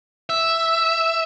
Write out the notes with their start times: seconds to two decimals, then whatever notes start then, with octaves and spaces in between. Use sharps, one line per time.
0.30 E5